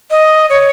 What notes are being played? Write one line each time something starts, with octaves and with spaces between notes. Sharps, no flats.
D#5
C#5